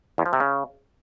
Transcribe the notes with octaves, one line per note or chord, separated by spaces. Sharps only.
E2
F3
C3
C#3